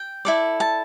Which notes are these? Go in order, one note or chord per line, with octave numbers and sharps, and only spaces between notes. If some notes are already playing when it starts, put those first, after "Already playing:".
Already playing: G5
E4 A4 D5
A5